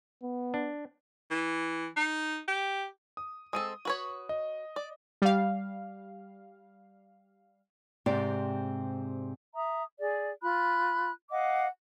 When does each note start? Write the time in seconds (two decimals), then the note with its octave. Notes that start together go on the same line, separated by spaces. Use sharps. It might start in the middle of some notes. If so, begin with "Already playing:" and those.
0.23 B3
0.54 D4
1.30 E3
1.96 D#4
2.48 G4
3.17 D#6
3.53 G#3 C4 A4 D#6 D#7
3.85 F#4 B4 C#5
4.29 D#5
4.76 D5
5.22 G3 F5
8.06 G#2 C3 C4 G4 D5
9.55 E5 A#5 D#6
10.00 G#4 D5
10.42 F4 B5 F#6
11.31 D#5 F5 F#5 D6